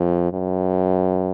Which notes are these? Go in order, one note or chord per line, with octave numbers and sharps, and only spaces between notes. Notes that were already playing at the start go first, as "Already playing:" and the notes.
Already playing: F2
F#2